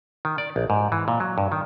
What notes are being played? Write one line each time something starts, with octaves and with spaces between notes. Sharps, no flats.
D#3
D5
A#1
G#2
E3
A#2
F#3
G2
D#3